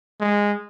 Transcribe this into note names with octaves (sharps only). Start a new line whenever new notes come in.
G#3